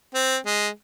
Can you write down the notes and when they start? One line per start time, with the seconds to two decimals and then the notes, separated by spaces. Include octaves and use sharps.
0.14 C4
0.46 G#3